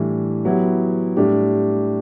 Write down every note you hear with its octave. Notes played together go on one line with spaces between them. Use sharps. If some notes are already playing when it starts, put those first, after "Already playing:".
Already playing: A2 E3 G3 D4
F#3 B3 E4 G4
A2 G3 D4 G4